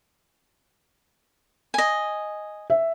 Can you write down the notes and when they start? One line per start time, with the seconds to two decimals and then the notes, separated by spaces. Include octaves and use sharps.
1.74 D#5 G#5
2.70 E5